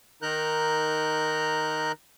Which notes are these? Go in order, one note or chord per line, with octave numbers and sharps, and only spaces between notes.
D#3 D#4 A#4 A#5 F#6 G6